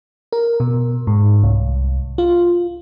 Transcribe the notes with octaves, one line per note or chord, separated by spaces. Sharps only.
A#4
B2
G#2
C2
F4